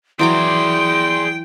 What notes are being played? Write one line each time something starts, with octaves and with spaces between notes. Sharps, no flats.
E3 F#3 G#4 D5 G5 C6 D6